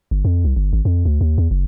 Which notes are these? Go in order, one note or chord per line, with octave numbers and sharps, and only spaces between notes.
G1
F2
C2
G1
G#1
F2
D2
D#2
E2
F#1